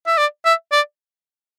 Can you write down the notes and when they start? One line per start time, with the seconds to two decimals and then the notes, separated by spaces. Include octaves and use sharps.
0.07 E5
0.18 D5
0.45 E5
0.72 D5